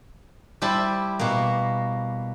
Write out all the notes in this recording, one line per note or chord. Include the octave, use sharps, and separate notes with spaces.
G3 E4 C5 A5 B5
B2 A#3